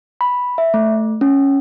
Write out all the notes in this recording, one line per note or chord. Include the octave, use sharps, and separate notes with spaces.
B5
E5
A3
C#4